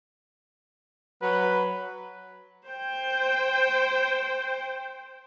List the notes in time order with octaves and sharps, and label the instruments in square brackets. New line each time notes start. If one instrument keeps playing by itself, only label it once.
[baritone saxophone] F#3 [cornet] B4
[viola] C5 G5